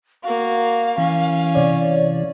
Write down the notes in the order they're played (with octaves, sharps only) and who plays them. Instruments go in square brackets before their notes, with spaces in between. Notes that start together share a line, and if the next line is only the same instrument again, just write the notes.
[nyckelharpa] A#3 F#4 [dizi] F5
[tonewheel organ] E3 [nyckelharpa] C#4
[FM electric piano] C3 C#5 D5